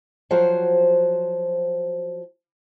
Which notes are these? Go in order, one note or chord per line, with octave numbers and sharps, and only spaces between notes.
F3 F#3 F#4 C5